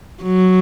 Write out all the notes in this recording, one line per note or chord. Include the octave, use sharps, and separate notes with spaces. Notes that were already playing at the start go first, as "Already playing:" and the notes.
F#3